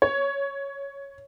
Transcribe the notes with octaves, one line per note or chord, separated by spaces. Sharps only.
C#5